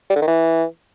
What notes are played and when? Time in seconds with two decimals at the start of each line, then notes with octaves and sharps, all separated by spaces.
0.10 G3
0.16 D3
0.22 D#3
0.28 E3